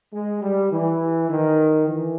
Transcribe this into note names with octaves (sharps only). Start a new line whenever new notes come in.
G#3
G3
E3
D#3
E3